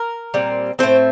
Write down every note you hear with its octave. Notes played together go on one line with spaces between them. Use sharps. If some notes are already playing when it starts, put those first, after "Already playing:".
Already playing: A#4
A#2 G3 C4
A2 A3 C4 C5